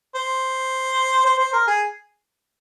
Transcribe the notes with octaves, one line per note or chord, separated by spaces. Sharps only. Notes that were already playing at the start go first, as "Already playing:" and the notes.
C5
C5
C5
A#4
G#4